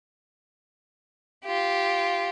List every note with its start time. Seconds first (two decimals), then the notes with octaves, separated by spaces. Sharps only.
1.45 F4 G4